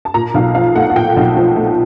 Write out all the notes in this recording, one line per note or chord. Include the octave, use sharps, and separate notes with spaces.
A5
A#2 A#5
B1 F5
F3 F5
A3 F#5
F#5
A#2 G5
B1
F3
A3